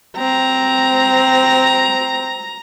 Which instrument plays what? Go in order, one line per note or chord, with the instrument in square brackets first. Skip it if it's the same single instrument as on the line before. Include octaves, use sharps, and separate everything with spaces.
[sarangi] C4 [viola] A#5